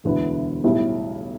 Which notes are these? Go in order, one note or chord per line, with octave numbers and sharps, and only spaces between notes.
E1 D2 D3 B3 E4
B1 A2 G3 E4